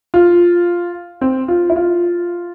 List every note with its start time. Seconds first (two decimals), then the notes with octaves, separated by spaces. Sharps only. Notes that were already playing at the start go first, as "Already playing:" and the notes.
0.14 F4
1.21 C4
1.48 F4
1.70 E4
1.76 F4